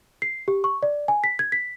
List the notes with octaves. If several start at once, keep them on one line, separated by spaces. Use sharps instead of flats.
C7
G4
C#6
D5
G#5
B6
G#6
B6